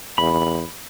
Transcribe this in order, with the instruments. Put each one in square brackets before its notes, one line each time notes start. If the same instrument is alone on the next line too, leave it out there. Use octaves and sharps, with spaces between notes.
[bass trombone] E2 [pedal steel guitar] B5